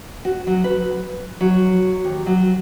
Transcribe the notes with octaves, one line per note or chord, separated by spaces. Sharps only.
F#4
F#3
B4
F#3
D#2
F#3